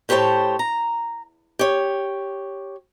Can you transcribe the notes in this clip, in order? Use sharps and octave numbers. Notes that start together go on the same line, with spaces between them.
A2 G4 C5 C#5 A5
A#5
G4 C#5